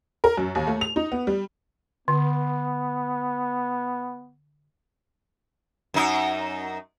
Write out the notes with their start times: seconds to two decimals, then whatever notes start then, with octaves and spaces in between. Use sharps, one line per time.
0.24 A#4
0.37 F#2
0.55 D#2
0.67 A3
0.81 F7
0.96 D#4
1.12 B3
1.27 G3
2.08 D3 B3
5.94 F#2 D#4